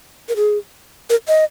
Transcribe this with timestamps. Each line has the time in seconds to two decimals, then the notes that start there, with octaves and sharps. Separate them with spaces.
0.29 A#4
0.36 G#4
1.10 A#4
1.28 D#5